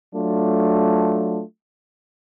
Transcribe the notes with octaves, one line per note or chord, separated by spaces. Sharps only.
F#3 A3 D4 F4